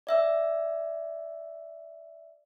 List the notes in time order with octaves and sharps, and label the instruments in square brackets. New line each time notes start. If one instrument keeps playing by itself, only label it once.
[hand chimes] D5 E5 E6